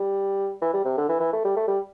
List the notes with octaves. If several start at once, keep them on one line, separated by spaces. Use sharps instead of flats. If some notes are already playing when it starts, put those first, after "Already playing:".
Already playing: G3
E3
G3
C3
D3
E3
E3
A3
G3
A3
G3